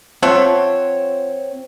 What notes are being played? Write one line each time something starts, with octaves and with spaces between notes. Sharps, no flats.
F3 C4 C#5 E5 F#5